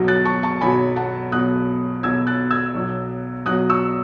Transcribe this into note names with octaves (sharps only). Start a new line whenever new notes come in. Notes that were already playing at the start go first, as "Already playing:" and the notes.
Already playing: B1 B2 F#3
F#6 A6
A5 C#6
A5 C#6
B1 B2 F#3 G#5 B5
F#5 A5
B1 B2 F#3 D#6 F#6
B1 B2 F#3 E6 G#6
F#6 A6
E6 G#6
B1 B2 F#3
B1 B2 F#3 D#6 F#6
C#6 E6